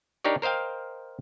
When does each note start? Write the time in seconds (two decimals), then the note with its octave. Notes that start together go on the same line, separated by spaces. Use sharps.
0.24 D4 D#4 G4 A#4 C#5 D5
0.42 A#4 C5 D#5 F5 G5